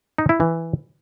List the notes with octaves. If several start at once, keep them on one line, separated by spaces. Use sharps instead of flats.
D#4
E4
E3